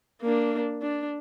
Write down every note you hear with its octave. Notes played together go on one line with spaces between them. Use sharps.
A#3 D4
D4